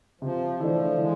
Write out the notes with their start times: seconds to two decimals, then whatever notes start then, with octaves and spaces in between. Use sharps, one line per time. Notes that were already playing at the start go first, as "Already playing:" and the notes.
0.21 C3 F3
0.59 E3 F3 A3 D4
0.98 E3 G#3